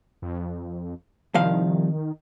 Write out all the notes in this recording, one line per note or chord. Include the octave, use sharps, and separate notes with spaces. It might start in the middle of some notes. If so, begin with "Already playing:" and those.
F2
C2 D#3 F3 F5